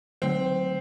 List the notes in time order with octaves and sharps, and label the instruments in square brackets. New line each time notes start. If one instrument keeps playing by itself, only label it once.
[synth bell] D3 F#3 A3 [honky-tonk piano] C4